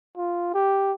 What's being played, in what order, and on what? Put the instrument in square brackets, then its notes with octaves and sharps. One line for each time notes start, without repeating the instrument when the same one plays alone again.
[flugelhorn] F4
G4